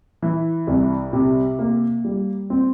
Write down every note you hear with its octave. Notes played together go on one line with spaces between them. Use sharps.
E3
C2
C3
A#3
G3
C4